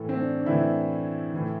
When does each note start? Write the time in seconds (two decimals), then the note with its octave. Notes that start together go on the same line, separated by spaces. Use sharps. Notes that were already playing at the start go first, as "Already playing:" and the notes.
Already playing: A2 E3 A4
0.09 C4
0.17 D4
0.40 D4
0.46 A2 E3 E4
1.34 A2 E3